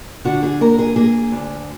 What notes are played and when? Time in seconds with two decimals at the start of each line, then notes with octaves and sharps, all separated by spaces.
0.25 D3 F#4
0.43 G#4
0.61 A#3 A#4
0.79 G#4
0.96 A#3 G#4
1.32 D2